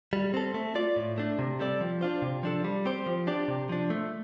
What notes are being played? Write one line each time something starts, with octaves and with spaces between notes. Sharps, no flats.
G3
C4 A4
A3
F4 D5
A2
A3 D4
C3
G3 C4 A4 D5
F3
D4 F4 C5
C3
F3 D4 A4
G3
C4 G4 C5
F3
D4 G4 D5
C3
F3 D4
A3